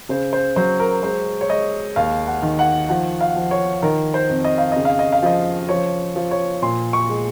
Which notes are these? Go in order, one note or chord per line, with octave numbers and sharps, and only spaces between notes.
C#3 C5
C5
F#3 C5
A#4
G#3 C5
C#5
G#3 D#5
D#2 F5
F#5
D#3
F#5
F3 F#5
F5
F3
C#5
D#3 A#4
C5
F2
D#5
F5
C#3 D#5
F5
D#5
F5
F3 D#5
F3 C#5
F3
C#5
A#2 C6
C#6
G#3